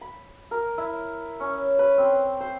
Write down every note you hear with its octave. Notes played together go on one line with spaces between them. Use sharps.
B5
A#4
E4
C#4
B4
C4
C5